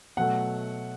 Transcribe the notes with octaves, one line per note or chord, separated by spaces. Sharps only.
B2 F#3 A3 F#5